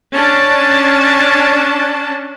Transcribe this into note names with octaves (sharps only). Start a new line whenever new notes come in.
C#4 D4 A5